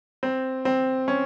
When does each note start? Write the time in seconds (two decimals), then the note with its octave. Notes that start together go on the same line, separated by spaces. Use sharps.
0.23 C4
0.65 C4
1.08 C#4